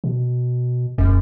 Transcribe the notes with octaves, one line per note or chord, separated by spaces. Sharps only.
B2
E1 F#2